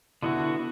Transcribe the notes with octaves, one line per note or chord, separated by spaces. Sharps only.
D3 B3 E4 F#4